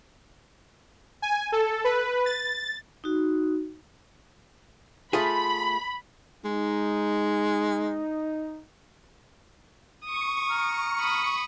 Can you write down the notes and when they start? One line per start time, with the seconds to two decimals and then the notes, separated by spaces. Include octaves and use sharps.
1.22 G#5
1.52 A4
1.84 B4
2.26 A6
3.04 D#4 F#4
5.13 A3 F4 G#4 B5
6.45 G#3 D#4
10.05 C#6 D#6
10.50 A#5 F6
10.99 B5 D#6